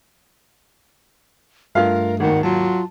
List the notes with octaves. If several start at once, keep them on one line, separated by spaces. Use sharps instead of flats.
G2 A3 F4 A#4 F5
G#1 D#2 D#3 F#5
F#3 F4 A5